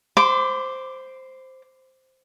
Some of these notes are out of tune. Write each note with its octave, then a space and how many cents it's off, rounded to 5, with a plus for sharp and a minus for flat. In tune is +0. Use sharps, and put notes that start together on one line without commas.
C5 +0 B5 +45 D6 +0